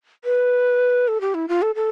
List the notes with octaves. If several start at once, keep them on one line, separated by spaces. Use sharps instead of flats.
B4
A4
G4
E4
F4
A4
A4